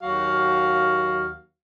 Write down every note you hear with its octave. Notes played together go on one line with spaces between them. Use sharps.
D#2 F#3 F#4 F5